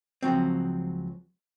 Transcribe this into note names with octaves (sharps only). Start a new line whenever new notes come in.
C#2 F3 F#3 C4